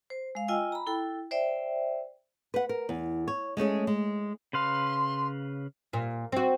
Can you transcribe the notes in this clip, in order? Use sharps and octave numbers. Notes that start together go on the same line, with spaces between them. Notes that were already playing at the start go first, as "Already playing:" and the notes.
C5
G#3 F5
F4 D#5 G5 G#5 E6
A#5 B5
E4 A4 G5
C5 D5 E5 G5
B4 F#5
A#4
E2
C#5
G#3 A3 C#4 G#4
G#3
C#3 B4 F5 C6
A#2
C4 F#4